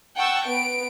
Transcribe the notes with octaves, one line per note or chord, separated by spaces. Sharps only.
F#5 G5 A5 C#6 E6
B3 D7